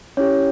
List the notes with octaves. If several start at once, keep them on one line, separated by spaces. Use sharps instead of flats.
C#4 E4 G4 C#5